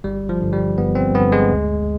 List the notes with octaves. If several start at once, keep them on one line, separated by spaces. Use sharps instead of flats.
G1 G3
F3
G2 D3
G3
G1 B3
C4
G2 D3 B3
G#3
D2